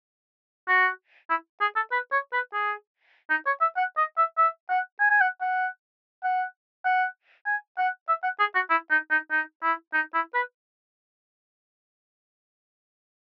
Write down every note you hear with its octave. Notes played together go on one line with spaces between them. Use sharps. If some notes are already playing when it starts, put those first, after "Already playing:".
F#4
E4
G#4
A4
B4
C#5
B4
G#4
D#4
C#5
E5
F#5
D#5
E5
E5
F#5
G#5
G#5
F#5
F#5
F#5
F#5
G#5
F#5
E5
F#5
G#4
F#4
E4
D#4
D#4
D#4
E4
D#4
E4
B4